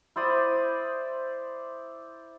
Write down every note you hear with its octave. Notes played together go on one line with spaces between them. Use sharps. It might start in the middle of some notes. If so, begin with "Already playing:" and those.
E4 C5 D5 D#6